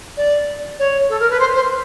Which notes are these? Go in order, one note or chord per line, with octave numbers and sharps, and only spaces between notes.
D5
C#5
A4
A#4
B4
C5
C5